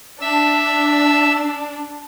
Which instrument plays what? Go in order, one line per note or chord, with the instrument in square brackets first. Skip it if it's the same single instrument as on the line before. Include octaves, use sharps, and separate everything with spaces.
[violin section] D4 [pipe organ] E5 E6